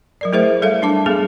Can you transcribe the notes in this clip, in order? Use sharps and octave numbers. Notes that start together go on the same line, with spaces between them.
F#3 A#4 D5
A3 E4 G#4 A#4 C5 E5
G3 A4 C#5 E5 F5
D4 A5 D6
G3 B3 G#4 A4